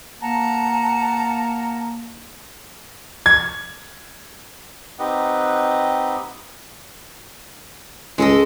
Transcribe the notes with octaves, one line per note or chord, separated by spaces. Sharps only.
A#3 F#5 A5 A#5
G#6
C4 D#4 G4 B4 D#5 F#5
C#2 G#3 A4 D#5